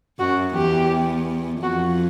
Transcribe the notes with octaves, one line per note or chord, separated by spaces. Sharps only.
F#2 F#4
E2 G4
F2 F#4